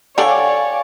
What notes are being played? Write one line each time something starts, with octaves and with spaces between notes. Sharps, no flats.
D3 D4 G4 C#5 D5 F5 G5 G#5